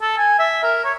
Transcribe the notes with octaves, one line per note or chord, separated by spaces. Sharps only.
A4
G#5
E5
A#4
C#5